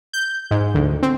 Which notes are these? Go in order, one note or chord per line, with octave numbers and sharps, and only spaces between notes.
G6
G#2
D2
C4